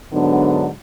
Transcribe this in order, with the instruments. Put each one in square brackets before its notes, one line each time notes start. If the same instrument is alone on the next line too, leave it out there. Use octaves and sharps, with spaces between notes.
[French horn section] G#2 D3 F#3 B3 D4